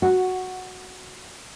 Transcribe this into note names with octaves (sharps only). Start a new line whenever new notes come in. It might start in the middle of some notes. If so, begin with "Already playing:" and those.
F#4